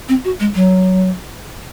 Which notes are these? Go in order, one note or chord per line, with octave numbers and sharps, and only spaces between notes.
C4
F#4
G#3
F#3